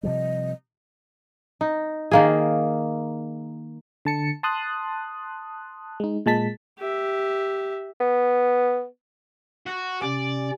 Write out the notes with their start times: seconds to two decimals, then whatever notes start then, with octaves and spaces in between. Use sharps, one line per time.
0.03 C3 F3 G3 D#5
1.61 D#4
2.11 D#3 A#3 G#4
4.05 D3 A5 C#7
4.43 A5 C6 D#6 F#6
6.00 G#3 D#4
6.26 A#2 G#3 A5 B6
6.79 G4 E5
8.00 B3
9.66 F#4
10.02 C3 C#4 D5